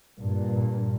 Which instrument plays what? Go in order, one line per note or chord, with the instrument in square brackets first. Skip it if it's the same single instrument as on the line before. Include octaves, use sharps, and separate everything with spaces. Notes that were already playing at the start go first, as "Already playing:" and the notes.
[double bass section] G2 A#2